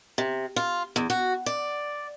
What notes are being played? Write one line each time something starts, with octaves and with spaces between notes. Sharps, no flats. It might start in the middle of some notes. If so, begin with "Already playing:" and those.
C3
F4
E2
F#4
D5